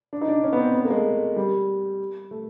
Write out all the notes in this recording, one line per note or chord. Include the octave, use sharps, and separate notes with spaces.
D4
D#4
D4
C#4
B3
C4
B3
A#3
G#3
A3
G3
A3